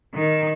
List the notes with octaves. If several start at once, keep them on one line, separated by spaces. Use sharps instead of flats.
D#3